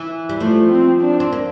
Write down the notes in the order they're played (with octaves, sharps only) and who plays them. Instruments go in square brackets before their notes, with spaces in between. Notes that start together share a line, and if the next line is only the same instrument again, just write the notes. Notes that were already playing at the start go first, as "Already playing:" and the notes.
Already playing: [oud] E3
G3
[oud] F3 [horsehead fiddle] A3
[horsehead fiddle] C4
D4
[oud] C4
A#3